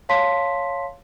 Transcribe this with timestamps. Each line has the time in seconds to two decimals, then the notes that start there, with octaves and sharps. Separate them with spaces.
0.09 C#5 F5 A5 C6 B6